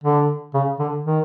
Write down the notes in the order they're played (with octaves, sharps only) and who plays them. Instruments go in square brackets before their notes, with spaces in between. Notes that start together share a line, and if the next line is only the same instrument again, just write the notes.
[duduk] D3
C#3
D3
D#3